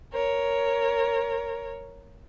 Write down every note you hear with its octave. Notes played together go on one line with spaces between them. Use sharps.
A#4 C#5